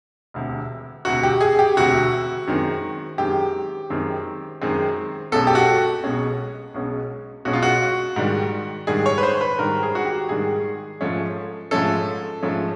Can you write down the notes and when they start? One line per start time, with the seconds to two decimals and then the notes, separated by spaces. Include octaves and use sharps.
0.34 E1 D2 C3
1.05 E1 D2 C3 F#4
1.23 G4
1.41 G#4
1.59 G4
1.77 E1 D2 C3 F#4
2.47 F#2 D#3 G#3 C4
3.18 F#2 D#3 G#3 C4 G4
3.90 F#2 D#3 G#3 C4
4.62 F#2 D#3 G#3 C4
5.32 B1 B2 G#3 C#4 A4
5.47 G4
5.55 F#4
6.04 B1 B2 G#3 C#4
6.74 B1 B2 G#3 C#4
7.45 B1 B2 G#3 C#4 F#4
7.53 F4
7.63 F#4
8.16 G#2 D#3 G3
8.87 G#2 D#3 G3 G#4
9.06 C#5
9.18 B4
9.23 C5
9.41 B4
9.58 G#2 D#3 G3 A#4
9.83 G#4
9.95 F#4
10.05 G4
10.29 G#2 D#3 G3 G#4
11.01 G#2 F3 A3 C#4
11.71 G#2 F3 A3 C#4 A4
12.43 G#2 F3 A3 C#4